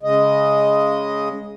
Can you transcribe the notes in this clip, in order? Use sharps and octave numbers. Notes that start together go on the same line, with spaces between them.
C#3 G#3 D#5